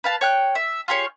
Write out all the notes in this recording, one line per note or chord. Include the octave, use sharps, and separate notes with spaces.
B4 F5 A5
C#5 G5 F#6
E5
F4 G4 G#4 C#5